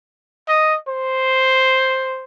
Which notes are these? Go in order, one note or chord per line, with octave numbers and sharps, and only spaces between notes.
D#5
C5